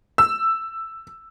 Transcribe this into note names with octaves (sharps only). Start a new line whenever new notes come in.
E6